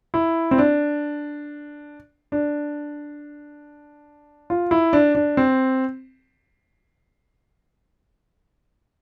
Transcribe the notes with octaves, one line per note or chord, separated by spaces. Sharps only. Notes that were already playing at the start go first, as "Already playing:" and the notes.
E4
C4
D4
D4
F4
E4
D4
D4
C4